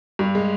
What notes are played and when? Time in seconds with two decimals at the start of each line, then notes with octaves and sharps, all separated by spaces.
0.19 G2
0.35 G#3